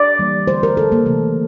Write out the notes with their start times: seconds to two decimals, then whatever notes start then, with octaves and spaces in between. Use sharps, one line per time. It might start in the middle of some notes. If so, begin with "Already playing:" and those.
Already playing: D5
0.19 E3 G3 A#3
0.48 D3 A3 C5
0.63 A#4
0.77 D3 A3 A4
0.92 A#3
1.06 C3 E3 A3